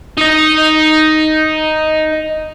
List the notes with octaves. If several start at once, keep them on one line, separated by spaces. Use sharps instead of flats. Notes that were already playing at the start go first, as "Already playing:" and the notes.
D#4 D#5